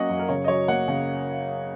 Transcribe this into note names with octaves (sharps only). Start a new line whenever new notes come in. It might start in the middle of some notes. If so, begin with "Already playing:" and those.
Already playing: F#3 A#3 C#4 D#5 F#5
F#2
A#4
C#3 C#5
D#5
F#3 C#5
A#3 F#5
C#3